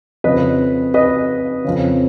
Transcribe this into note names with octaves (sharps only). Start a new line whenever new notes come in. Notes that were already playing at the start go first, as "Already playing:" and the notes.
F2 C#3 B4 D#5
B4 D#5
F2 C#3